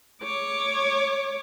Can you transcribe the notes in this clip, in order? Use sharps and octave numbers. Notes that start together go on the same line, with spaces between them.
C#5 D6